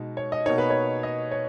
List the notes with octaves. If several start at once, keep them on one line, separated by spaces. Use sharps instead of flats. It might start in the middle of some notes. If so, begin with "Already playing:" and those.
Already playing: B2 G#3 D#4
C#5
D#5
B2 A#3 D#4 C#5
B4
C#5
D#5
C#5